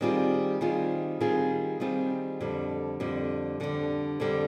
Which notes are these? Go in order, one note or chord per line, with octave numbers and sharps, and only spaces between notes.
D#3 G3 C4 F4 G#4
D#3 G3 C4 F4 G#4
D#3 G3 C4 F4 G#4
D#3 G3 C4 F4 G#4
F2 D3 G3
F2 D3 G3
F2 D3 G3
F2 D3 G3